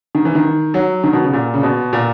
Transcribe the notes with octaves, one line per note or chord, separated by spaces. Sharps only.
D#3
E3
D#3
F#3
D#3
B2
C#3
A#2
C#3
B2
A#2